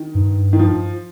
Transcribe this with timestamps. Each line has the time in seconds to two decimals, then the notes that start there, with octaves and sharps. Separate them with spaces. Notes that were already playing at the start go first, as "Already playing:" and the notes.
Already playing: D#3
0.15 G2
0.53 D#3
0.59 F3